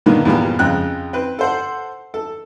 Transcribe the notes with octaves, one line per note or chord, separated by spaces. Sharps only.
G2 A#2 D3 D#3 A#3 B3
E2 G2 A#2 F3 G3 B3
F2 C#3 G#3 G5 F#6
C4 B4
A4 C5 F#5
A4